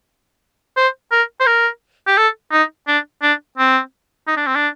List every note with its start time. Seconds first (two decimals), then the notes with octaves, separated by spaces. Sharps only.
0.77 C5
1.12 A#4
1.40 C5
1.47 A#4
2.07 G4
2.17 A4
2.52 D#4
2.88 D4
3.22 D4
3.58 C4
4.28 D#4
4.37 D4
4.47 C4
4.56 D4